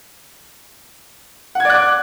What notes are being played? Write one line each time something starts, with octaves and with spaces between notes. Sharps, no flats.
D5 F#5 D6 F#6 G#6